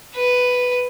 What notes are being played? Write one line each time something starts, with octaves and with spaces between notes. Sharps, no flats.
B4